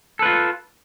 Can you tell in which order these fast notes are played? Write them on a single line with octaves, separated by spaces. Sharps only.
A4 B4 F4